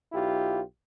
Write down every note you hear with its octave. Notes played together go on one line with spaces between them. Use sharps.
B1 E4 F4 G4